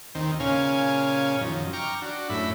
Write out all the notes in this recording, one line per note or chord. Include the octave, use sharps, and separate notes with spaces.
D#2 D#3 C4
A#2 C#3 C#4 F5 G#5
F#2 D#3 F3
G5 A#5 C#6 D6 F6
D4 F#4
F#2 A2 E4 B5